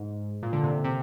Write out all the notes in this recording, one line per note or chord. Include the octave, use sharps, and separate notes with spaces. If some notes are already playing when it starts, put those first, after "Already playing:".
Already playing: G#2
A#2
D3
C3
C3